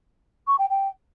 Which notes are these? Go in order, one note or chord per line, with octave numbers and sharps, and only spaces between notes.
C#6
G5
G5